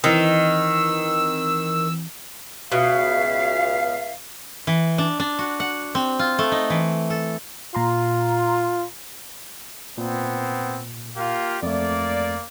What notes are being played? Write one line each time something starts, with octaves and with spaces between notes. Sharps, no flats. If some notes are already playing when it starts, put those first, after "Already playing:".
D#3 E3 C4 E6
C#2 B2 E5 F5
E3
D4
D4
F#4
F#5
C4
F4
A3
D#4
E3
A4
A#2 F4 A#5 C6
A#2 B3 C4
A#3 F4 G4
F2 A3 A#3 D5